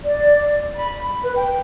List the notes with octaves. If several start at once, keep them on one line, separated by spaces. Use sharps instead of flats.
D5
B5
B5
B4
G5